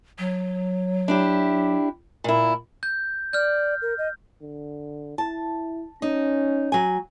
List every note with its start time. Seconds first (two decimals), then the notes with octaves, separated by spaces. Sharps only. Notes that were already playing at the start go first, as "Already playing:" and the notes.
0.18 F#3
1.08 D4 E4 G4
2.24 A#2 E4
2.83 G6
3.33 D5 F6 G6
3.82 A#4
3.98 D#5
4.42 D3
5.18 E4 A5
6.02 C#4 D#4
6.72 F#3 G#5